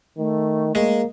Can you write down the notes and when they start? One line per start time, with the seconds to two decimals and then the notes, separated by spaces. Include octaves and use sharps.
0.18 D#3 A3
0.75 G#3 A#3